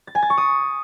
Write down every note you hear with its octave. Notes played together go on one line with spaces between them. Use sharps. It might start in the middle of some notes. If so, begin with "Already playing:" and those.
A6
G#5
A6
C#6
D#6